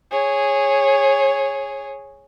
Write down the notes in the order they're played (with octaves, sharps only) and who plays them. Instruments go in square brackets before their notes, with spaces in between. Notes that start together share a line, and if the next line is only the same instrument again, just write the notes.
[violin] G#4 C#5